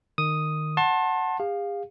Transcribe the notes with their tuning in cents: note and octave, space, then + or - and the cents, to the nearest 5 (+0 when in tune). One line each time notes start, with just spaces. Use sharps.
D#3 -20 D#6 +0
F#5 +0 A5 +10 C6 +35
G#4 -45 F5 +10